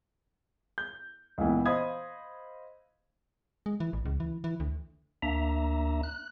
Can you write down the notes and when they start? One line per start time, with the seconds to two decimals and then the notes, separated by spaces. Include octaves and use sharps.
0.78 G6
1.38 C#2 A#2 E3 B3
1.66 C5 D#5 F5 B5 D#6 G#6
3.66 G#3
3.80 E3
3.93 A1
4.05 C#2
4.20 E3
4.44 E3
4.60 D2
5.22 D2 A#3 D4 E5 A#5
6.03 F#6